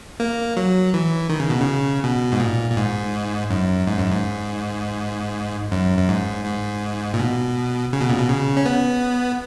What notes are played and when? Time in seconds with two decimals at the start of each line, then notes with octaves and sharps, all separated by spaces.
0.20 A#3
0.57 F#3
0.94 E3
1.29 D#3
1.40 C#3
1.50 B2
1.61 C#3
2.04 B2
2.32 G#2
2.40 A#2
2.70 A#2
2.77 G#2
3.50 F#2
3.87 G#2
3.98 F#2
4.11 G#2
5.72 F#2
5.98 F#2
6.09 G#2
6.45 G#2
7.14 A#2
7.19 B2
7.93 C#3
8.01 B2
8.09 A#2
8.18 B2
8.29 C#3
8.57 C#4
8.66 B3